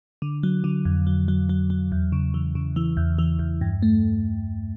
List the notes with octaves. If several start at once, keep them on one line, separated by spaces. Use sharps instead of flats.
D3
F#3
D3
F2
F#3
F#3
F#3
F#3
E2
C#3
E3
C#3
E3
E2
E3
E2
G2
A3